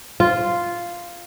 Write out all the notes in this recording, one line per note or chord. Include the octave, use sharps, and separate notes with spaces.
F4